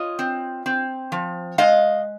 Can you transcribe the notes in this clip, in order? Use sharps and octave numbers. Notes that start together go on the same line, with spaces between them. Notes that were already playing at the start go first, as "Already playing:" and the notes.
Already playing: F4 C#5 D#5
C4
C4
F3
G#3 D#5 F5